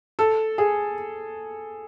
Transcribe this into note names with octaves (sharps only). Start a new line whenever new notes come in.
A4
G#4